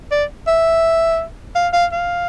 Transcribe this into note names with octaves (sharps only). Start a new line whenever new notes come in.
D5
E5
F5
F5
F5